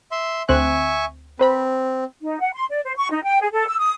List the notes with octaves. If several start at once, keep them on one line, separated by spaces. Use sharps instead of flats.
E5 C6
D2 C4 E5 G#5 C#6 F#6
C4 B4 C5 B5
D#4
F#5
C6
D5
C5
C#6
D#4
G5
G#4
A4
E6
D#6